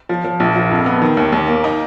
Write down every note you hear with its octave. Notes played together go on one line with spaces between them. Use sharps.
F3
F3
A#1
F3
F2
B3
D#3
D#2
D#2
A#3
D#4